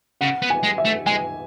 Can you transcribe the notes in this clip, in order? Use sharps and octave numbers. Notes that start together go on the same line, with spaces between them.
C#3 F#5
B3
G#5
G#3
E5
A3
G#3 G#5